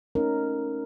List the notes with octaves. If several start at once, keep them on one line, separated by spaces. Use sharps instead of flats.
A3 C#4 D#4 A#4